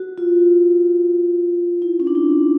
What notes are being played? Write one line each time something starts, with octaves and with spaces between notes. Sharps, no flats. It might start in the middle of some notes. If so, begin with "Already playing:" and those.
Already playing: F#4
F4
E4
C#4
D4
D#4